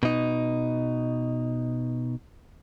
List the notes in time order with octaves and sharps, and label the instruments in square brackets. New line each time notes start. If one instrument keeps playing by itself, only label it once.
[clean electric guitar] B2 D#4